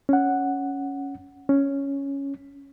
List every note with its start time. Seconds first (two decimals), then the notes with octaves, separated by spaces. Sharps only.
0.09 C#4 F#5
1.49 C#4